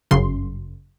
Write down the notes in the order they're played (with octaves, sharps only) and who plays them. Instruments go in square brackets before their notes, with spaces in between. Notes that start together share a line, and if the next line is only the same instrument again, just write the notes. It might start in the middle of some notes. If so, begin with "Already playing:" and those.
[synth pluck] G1 F#2 C#3 C6